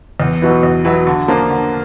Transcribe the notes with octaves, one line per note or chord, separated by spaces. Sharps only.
E2
B2 F#3 B3 E4
E2
B2 F#3 B3 E4
D3
F3 A#3 D4 F4
D3